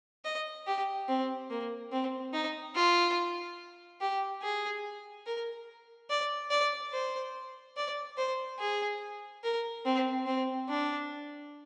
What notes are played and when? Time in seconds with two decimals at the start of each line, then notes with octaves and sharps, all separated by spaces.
0.25 D#5
0.67 G4
1.08 C4
1.50 A#3
1.92 C4
2.33 D#4
2.75 F4
4.01 G4
4.42 G#4
5.26 A#4
6.10 D5
6.50 D5
6.93 C5
7.77 D5
8.17 C5
8.59 G#4
9.44 A#4
9.85 C4
10.26 C4
10.69 D4